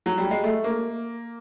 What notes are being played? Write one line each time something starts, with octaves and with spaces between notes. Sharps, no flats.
F#3
G3
G#3
A3
A#3